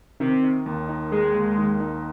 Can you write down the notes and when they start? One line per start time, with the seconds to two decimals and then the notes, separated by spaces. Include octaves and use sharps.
0.20 C3 D#3
0.43 D#4
0.66 D#2
0.89 D#4
1.12 G#3 D#4
1.35 D#2
1.58 D#3
1.80 D#4